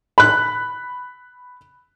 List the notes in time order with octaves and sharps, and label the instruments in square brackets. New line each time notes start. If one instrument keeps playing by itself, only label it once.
[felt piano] B5 F#6